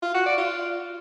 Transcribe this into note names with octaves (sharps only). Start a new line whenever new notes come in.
F4
F#4
D5
F4